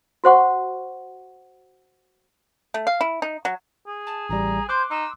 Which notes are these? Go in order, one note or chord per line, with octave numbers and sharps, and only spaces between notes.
F#4 C5 F#5 C#6
A3
F5
E4
D#4
F#3
G#4
A5
A1 G3 A#5
C5 C6 D6 F#6 G6
D#4 E6